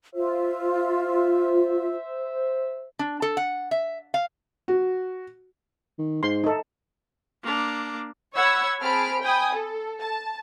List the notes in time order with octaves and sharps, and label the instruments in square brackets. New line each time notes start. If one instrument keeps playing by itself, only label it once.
[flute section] F4 [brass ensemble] C5 E5
[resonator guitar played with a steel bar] D4
A4
F#5
E5
F5
[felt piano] F#4
[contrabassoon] D#3
[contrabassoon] G#2 [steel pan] C6
[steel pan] D#4 A4
[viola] A#3 D4
[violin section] C#5 F#5 B5 E6 G#6
C4 G#4 A5 B5 F6 D7
G5 G#5 B5 D#6
A4
A5